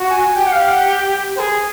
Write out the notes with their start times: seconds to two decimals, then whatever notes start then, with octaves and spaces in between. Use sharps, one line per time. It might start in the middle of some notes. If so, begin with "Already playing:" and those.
Already playing: F#4
0.10 G#5
0.35 G4 G5
0.46 F#5
0.53 F5
0.69 F#5
1.36 C5
1.39 G#4